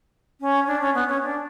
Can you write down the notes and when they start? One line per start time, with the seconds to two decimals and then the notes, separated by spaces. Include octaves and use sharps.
0.41 C#4
0.67 D4
0.81 C#4
0.94 B3
1.08 C#4
1.23 D4